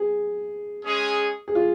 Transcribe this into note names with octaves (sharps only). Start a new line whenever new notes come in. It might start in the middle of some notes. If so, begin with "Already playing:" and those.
Already playing: G#4
G#3 C#4 G#4
G#4
F4